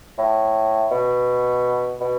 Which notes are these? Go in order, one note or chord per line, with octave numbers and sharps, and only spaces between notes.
A2
B2
B2